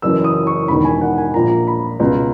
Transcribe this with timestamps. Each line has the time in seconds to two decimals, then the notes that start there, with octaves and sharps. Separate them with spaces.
0.02 F#1 F#2 E3 E6
0.24 D#6
0.47 C#6
0.68 E1 E2 D#3 B5
0.85 G#5
1.01 F#5
1.18 G#5
1.34 A#1 A#2 A#5
1.67 B5
2.00 C#2 B2 A#5